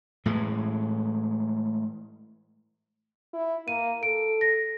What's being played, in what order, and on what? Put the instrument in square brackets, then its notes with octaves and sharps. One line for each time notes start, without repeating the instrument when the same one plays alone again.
[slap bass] A2 E3 G#3
[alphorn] E4
[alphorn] A#3 [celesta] D#7
[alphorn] A4 [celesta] D7
[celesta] A#6